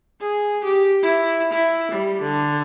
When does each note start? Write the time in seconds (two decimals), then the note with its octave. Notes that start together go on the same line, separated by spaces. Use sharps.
0.20 G#4
0.64 G4
1.03 E4
1.53 E4
1.92 G3
2.22 D3